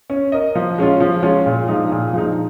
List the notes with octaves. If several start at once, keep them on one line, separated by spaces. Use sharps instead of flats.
C#4
A#4 D#5
F3
G#3 C#4 F4
F3
G#3 C#4 F4
A#2
F3 G#3 D#4
A#2
F3 G#3 D#4